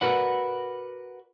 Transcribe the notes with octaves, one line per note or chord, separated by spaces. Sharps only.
F#4 A#4 B4 D5 F#5